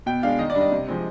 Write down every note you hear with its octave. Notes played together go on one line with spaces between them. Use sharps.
B2 G5
G#3 D4 F5
D#3 D#5
D5
G3 D4
D#5
C3
F3 G#3 C4